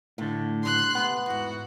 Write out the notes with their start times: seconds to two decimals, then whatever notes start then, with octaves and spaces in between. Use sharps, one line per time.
0.18 A2 D3 A3
0.63 C#3 F#3 G3 C6 F#6
0.95 C3 A3 B3
1.26 E2 G#2 F#4